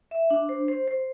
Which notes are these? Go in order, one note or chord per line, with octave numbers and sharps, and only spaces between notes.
E5
D4
C5
C5
C5